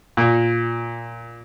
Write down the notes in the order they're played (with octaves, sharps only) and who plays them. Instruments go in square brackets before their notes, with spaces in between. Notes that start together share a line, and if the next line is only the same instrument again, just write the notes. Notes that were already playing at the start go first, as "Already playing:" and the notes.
[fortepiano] A#2